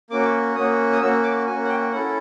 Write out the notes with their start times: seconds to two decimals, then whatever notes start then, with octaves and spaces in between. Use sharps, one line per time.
0.10 A#3 C#4 F#4 D6
0.56 A#3 C#4 F#4 D#6
0.93 D#6
1.01 A#3 C#4 F#4 E6
1.23 D6
1.46 A#3 C#4 F#4 G#5
1.64 F#5
1.69 G5
1.92 C#4 E4 A4 F#5